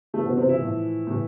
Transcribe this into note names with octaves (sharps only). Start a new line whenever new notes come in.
G2 E3 A3
B2 B3
C3 C4
E3 E4
A2 F3
A2 E3